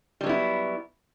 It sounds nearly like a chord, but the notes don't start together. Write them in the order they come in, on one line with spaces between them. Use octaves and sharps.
G3 F#3 B3 E4